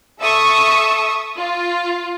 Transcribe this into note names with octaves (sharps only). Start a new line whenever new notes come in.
A4 E5 C#6 D#6 E6
F4